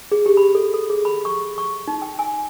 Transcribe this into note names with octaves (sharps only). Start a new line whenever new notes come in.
G#4
G4
B5
A4
A4
G#4
B5
C#6
C#6
D#4
G5
G#5